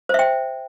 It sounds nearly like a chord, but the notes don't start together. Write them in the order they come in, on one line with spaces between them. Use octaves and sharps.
C5 E5 G5